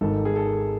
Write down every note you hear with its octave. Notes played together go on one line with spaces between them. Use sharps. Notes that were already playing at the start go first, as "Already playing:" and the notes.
G#1 G#2 D#3 A4
G#4
A4